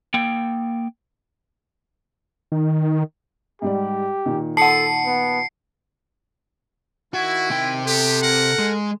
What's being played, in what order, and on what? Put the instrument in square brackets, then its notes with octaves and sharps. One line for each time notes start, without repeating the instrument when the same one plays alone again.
[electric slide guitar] A#3 G5
[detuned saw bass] D#3
[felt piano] G#2 G3 D5 [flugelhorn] G4
[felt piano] A#2 D#3
[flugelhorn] A4 [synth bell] F#5 A5 [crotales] C7 C#7
[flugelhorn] B3
[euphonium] D#3 [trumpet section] E4 [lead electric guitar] F#4
[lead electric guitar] C3 G5
[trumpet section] B3 G4 [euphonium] A4
[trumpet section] A#4 F#5
[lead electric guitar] G#3